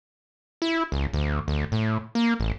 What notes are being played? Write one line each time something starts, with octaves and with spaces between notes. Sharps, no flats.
E4
C#2
D2
D2
A2
A#3
A1